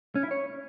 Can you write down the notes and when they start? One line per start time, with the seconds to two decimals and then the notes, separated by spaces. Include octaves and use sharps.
0.15 C#4
0.23 E4
0.31 C#5